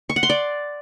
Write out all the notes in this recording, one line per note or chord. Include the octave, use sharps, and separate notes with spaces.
C#6
F#5
C6
D5